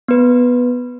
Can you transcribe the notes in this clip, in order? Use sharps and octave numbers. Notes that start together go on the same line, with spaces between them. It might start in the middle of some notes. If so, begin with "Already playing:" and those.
B3 B4